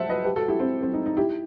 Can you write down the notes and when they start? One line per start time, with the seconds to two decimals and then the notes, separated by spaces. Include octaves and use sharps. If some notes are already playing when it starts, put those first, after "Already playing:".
Already playing: C5 E5 F#5 A5
0.09 B4 D#5
0.24 G4 B4
0.36 F#4 A4
0.48 E4 G4
0.59 C4 E4
0.82 C4
0.94 D#4
1.06 D#4
1.17 E4 G4